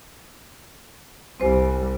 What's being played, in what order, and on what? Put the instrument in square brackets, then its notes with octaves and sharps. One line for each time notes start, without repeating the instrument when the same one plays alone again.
[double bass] C2 G3 [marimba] C4 C5 G#5